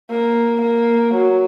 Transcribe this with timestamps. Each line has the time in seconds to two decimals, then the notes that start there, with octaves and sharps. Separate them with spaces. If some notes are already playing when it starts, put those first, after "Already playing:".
0.10 A#3
0.62 A#3
1.15 F#3